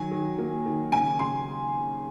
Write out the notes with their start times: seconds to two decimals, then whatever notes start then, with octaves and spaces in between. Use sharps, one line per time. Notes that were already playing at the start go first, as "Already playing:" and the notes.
Already playing: D#3 F#3 G#5
0.11 D#3
0.39 A#3
0.66 D#3
0.92 C#3 G#5
1.19 C#3 C6